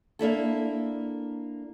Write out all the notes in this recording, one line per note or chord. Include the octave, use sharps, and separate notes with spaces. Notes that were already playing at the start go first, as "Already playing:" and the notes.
A#3 D4 E4 A4